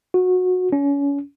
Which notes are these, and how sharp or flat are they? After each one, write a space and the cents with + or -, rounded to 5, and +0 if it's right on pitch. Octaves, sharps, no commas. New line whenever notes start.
F#4 -20
C#4 +30